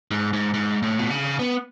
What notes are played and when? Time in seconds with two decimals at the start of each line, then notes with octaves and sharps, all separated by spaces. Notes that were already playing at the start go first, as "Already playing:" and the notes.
0.11 G#2
0.33 G#2
0.54 G#2
0.83 A2
0.99 B2
1.11 C#3
1.39 B3